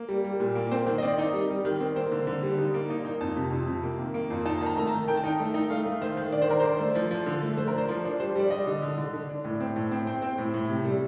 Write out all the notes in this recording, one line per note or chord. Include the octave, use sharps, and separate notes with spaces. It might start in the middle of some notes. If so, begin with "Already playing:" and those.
Already playing: A#3
G3
G3
A#2
A#3
C4 C5
D#3
D#5
C4 D5
D#4
G3
G3
D#3
C4
A#3 C5
D3
D3
G3
D#4
A#3
D#4
D#4
F2 A5
C3
F2
C3
A#3
D#3
A#3
F2
D#4 A5
D#3 A5
A#5
A3 A#5
A5
D#3
D#3 G5
A5
D#4 G5
A3
D#4
A3 F5
A3
D#3 C5
D#3
D4 D5
C5
D#3 A#4
D4 C5
A3
F3
F3
D3
A3
A3 C5
D4 A#4
C5
F3
D4
G3 C5
G3 D5
G3 D#5
D3
D3
D3
D3
D4
A2
C4
A2
C4
C4 G5
C4
A2
A2
C3
G3